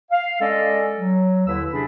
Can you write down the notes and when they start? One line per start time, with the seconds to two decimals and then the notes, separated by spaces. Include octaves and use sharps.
0.11 F5
0.41 G#3 C#4 A4 D5 D#5
0.98 F#3
1.47 D#2 D3 E4 B4 E6
1.72 C3 C#4 D4 G#4 B5